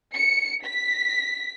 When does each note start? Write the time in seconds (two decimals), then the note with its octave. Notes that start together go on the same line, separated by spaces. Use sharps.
0.14 C#7
0.64 B6